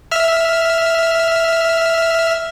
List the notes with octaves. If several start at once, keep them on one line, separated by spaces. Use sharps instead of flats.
E5 F6